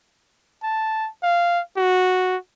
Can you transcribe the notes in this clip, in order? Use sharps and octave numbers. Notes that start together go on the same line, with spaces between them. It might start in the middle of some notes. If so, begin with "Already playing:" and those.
A5
F5
F#4